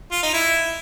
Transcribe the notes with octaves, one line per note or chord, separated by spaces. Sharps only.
F4
D#4
E4